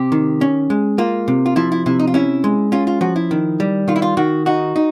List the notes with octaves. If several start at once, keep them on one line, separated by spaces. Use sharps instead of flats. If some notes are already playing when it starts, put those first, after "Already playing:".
Already playing: C3 G4
D#3
C#4
G#3
A#3 F4
C3
F4
F3 E4
E4
C3 E4
D#4
F4
C#4 E4
G#3
C#4 F4
F4
F3 F#4
E4
D#3
G3
D#3 F4
E4
F4
D#3 F#4
D#4 F#4
D#4